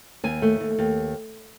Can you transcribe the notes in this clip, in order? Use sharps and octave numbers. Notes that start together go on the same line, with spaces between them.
D#2 G#5
A3
D#2
D#2